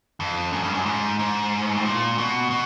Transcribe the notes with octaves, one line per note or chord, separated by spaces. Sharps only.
F2
F#2
G2
F#2
G#2
G#2
A2
A#2
B2
B2